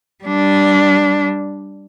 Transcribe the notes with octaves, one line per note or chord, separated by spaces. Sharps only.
G3 D4